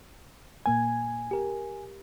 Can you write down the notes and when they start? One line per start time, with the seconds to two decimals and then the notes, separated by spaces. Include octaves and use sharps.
0.66 A#2 A#3 G#5 G#6
1.31 G4 A#4